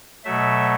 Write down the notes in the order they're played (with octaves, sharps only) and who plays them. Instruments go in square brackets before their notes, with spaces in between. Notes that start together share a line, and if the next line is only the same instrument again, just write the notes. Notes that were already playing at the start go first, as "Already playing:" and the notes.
[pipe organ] B2 F#3 A3 E5